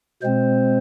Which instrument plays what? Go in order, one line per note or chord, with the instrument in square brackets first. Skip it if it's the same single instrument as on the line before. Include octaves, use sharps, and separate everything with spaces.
[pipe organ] B2 G#3 C4 C5